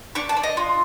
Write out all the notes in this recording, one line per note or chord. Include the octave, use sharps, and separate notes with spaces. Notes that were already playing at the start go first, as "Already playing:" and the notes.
D4 C#6
A5
D4
D#5
F4